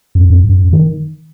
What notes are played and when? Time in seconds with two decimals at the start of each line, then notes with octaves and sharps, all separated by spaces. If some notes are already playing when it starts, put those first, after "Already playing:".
0.15 F#2
0.30 F#2
0.44 F#2
0.73 D#3